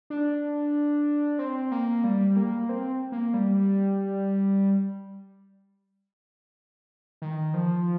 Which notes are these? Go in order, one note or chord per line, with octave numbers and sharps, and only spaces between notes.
D4
C4
A#3
G3
A#3
C4
A#3
G3
D#3
F3